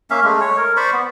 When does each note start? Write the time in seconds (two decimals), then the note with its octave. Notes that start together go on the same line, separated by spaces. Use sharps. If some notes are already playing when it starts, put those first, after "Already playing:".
0.10 A#3 C#4 E5 F5
0.24 G#3 A3
0.41 C#5
0.58 A#4
0.77 C5 D5 B5 C#6
0.93 B3